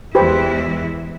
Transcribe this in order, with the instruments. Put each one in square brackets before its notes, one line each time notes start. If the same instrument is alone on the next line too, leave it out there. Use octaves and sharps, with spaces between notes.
[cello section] E2 G#3 E4 [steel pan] G4 B4 C5